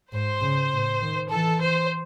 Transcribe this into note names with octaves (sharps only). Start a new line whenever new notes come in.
G#2 C5
C#3
A2
D#3
E3 A4
C5